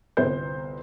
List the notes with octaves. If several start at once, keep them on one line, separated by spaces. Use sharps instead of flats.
G1 C2 B3 C5 G6